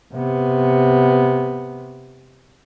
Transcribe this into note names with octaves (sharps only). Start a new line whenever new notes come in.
C3 B3